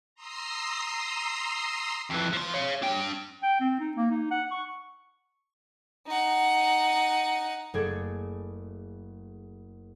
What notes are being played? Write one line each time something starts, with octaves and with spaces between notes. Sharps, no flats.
A#5 C6 D#6 E6 C7
F2 E3
F3 C6
C#5 F5
D4 G5
G5
C4
D#4
A#3
D#4
F#5
C#6
D#4 F#5
F#1 A3 G#4 A4 D6 G#6